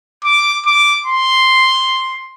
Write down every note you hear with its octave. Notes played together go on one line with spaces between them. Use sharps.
D6
D6
C6